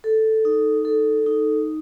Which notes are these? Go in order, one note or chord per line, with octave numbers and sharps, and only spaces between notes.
A4
D#4
A4
D#4